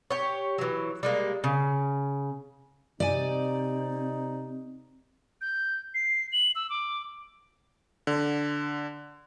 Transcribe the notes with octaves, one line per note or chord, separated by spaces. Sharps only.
G4 C#5
E3 F#3
G3 G#3 A#3
C#3
C3 C4 D#4 D5 G#5
G6
C7
F#7
E6
D6
D3